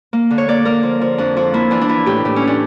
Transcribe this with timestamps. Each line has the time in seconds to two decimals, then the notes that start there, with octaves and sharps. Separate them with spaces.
0.13 A#3
0.31 D3
0.38 C#5
0.48 A#3 D5
0.65 A#3 A#4
0.83 F3
1.01 F3
1.18 F2 D4
1.37 F3
1.53 A#3 E4
1.71 E3 D4
1.81 D4
1.89 E3 E4
2.06 A2 G4
2.25 A2
2.36 C#4
2.42 E3
2.47 D4